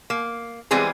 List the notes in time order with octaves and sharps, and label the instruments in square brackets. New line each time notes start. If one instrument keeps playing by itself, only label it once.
[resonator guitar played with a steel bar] A#3
E3 G3 G#3 B3 C4 G#4